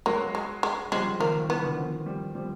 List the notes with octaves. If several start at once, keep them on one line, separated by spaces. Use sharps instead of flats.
F#3 G#3 A#3
G#3
G#3
F3 G3 G#3
D#3 F3 A#3
E3 B3
D#3
D3 E3
D#3 F3
F3 G3
F3 G3